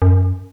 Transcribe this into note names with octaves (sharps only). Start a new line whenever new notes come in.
F#2